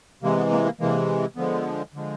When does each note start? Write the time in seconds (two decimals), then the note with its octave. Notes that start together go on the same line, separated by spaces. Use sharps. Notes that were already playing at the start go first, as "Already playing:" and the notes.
0.23 C3 E3 G#3 A#3
0.37 B3
0.52 A#3
0.65 A#3
0.80 C3 E3 G#3 A#3
1.36 D3 F3 G#3 B3
1.94 D3 F3 G#3